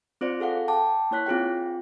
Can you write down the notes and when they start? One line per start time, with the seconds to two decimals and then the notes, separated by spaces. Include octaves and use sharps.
0.21 C4 F4 C5 D5
0.40 G#4 A4 F5 F#5
0.68 G5 A5 D6
1.11 A#3 E4 C#5 F#6 B6
1.26 C4 F4 G#4 G5